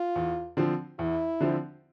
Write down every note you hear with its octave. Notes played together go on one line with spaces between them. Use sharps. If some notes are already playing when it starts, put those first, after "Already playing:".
Already playing: F4
E2
D3 F3 C4
E2 E4
D3 F3 C4